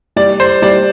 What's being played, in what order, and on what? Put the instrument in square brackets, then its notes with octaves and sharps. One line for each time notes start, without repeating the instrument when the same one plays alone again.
[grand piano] G3 D5
C5
G3 D5